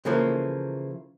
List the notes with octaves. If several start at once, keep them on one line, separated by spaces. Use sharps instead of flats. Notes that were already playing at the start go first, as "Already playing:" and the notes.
C#3 E3 F3 A3 A#3